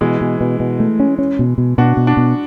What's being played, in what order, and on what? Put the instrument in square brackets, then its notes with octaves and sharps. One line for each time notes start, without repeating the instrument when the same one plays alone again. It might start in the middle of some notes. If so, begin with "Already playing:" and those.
[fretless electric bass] B2 [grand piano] E3 G#3
[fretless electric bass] B2
B2
B2
A3
C#4
C#4
B2
B2
[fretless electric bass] B2 [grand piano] D4 F#4
[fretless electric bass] B2
[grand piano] D4 F#4
[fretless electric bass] B2